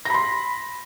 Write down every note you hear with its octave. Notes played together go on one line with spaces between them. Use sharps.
B5 C6 A#6